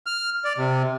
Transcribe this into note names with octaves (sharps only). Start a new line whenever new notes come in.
F6
D5
C3